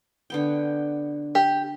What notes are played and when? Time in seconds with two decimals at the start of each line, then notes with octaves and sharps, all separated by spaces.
0.30 D3 B3 G5
1.35 G4